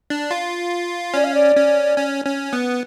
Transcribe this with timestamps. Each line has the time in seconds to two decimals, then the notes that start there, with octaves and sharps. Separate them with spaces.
0.10 D4
0.31 F4
1.14 C#4 D5
1.24 F5
1.34 D5
1.56 C#4
1.98 C#4
2.26 C#4
2.53 B3